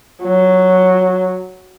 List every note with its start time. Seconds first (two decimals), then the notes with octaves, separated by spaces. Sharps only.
0.23 F#3